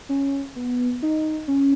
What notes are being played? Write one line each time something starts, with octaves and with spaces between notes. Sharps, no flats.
C#4
B3
D#4
C#4